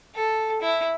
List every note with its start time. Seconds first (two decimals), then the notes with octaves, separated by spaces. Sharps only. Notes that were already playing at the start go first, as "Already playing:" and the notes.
0.15 A4
0.62 E4